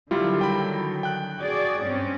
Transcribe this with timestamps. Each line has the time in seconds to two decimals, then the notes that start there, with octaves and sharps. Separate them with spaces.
0.11 D3 D#3 F#3 G3 E4 F4
0.41 G5 B5
1.03 G5 F#6
1.38 F#4 G#4 D5
1.83 G2 C4 C#4